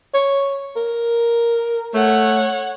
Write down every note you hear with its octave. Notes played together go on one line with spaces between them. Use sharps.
C#5
A#4
A3 C#5 F#5